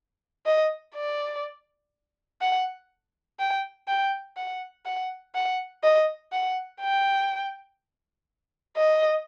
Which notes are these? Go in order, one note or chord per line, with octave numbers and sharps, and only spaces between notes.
D#5
D5
F#5
G5
G5
F#5
F#5
F#5
D#5
F#5
G5
D#5